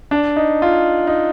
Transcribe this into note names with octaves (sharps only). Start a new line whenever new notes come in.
D4
D#4
F4
D#4